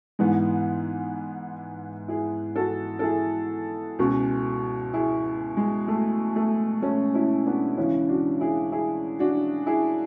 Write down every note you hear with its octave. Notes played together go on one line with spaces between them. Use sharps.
G#2 E3 G#3 B3
E4 G#4
F#4 A4
A4
E4 G#4
C#2 B2
E4 G#4
G#3
A3
A3
A3 C#4
C#4 E4
B3 D4
C#2 C#3 E3 C#4 E4
D4 F#4
E4 G#4
E4 G#4
D4 F#4
E4 G#4